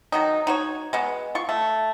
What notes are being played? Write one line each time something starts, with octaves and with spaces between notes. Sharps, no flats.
D#3 F#3 D#4
D#4 F#4 C#5
G#3 B3 F#4
F4 C#6
A3